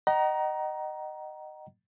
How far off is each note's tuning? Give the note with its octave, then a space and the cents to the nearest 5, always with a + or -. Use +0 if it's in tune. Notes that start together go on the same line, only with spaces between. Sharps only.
D#5 -20 F#5 +45 A#5 +15